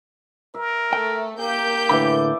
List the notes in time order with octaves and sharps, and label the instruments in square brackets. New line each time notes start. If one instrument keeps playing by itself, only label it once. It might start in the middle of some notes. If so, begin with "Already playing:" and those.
[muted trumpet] A#4 [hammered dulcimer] E5
[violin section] A3 [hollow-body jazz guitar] G5
[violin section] A#3 G6 [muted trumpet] G4
[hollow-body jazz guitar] A2 D3 B5 [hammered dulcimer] E3 D5 E5